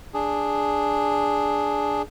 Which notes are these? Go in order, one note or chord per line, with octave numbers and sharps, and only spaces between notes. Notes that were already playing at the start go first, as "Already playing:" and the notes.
D4 G#4